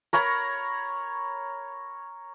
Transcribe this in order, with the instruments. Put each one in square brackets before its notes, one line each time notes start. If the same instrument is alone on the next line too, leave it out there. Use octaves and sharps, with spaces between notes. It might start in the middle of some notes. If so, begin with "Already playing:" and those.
[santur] A#4 C#5 A#5 B5